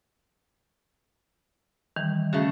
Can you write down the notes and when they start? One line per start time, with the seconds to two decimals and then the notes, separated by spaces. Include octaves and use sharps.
1.96 D#3 E3 G3
2.33 C#3 A3 F#4